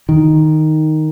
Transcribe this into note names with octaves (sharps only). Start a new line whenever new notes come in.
D#3